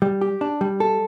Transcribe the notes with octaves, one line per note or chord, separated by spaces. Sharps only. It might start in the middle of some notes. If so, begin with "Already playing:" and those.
G3
G4
D4
G3
A4